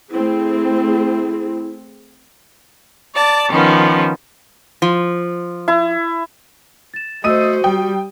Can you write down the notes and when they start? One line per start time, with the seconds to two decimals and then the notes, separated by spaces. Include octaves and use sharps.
0.11 A3 C4 E4 G#4
3.14 D5 A5 D6
3.50 D#3 F3 B3 C#4
4.82 F3
5.68 E4
6.94 A6 E7
7.24 A3 F#4 C5 D#5 D#6 E6 D#7
7.64 G3 G5 D#6